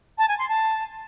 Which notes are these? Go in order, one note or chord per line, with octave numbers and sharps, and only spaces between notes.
A5
G#5
C6
A5